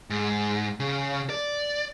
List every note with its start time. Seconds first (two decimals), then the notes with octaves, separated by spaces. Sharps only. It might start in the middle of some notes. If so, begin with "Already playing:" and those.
0.10 G#2
0.80 C#3
1.30 D5